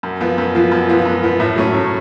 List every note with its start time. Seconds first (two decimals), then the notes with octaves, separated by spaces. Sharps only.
0.03 F#2
0.21 F3 B3 F4
0.38 F#2
0.55 F3 B3 F4
0.72 F#2
0.89 F3 B3 F4
1.05 F#2
1.23 F3 B3 F4
1.40 A2
1.56 F#3 A3 C#4
1.74 A2